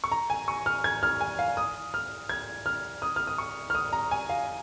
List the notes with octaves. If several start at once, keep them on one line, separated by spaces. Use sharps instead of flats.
C#6
A#5
G#5
C#6
F6
G#6
F6
G#5
F5
D#6
F6
G#6
F6
D#6
F6
D#6
C#6
F6
D#6
A#5
G#5
F5